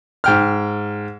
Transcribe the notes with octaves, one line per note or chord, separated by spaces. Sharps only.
G#2 G5 F6